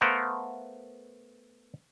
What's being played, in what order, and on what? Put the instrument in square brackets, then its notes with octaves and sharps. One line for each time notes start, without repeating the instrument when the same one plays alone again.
[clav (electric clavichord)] A3 B3 A#4 C5 F5 F#5